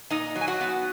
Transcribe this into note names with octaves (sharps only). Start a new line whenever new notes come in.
A#2 D#4 D#5
F#3
G#5
F#4 F#5
B3